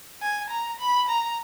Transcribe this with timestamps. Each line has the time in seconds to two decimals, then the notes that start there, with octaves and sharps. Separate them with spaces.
0.22 G#5
0.50 A#5
0.79 B5
1.09 A#5